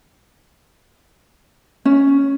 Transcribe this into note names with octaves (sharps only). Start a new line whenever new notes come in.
C#4